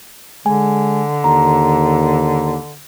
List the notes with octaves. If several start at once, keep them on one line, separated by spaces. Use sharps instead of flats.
D3 G#3 G#5
D#2 A#5